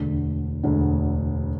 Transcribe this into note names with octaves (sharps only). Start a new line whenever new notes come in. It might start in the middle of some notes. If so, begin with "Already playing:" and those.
Already playing: E1 D2 D3
E1 D2 D3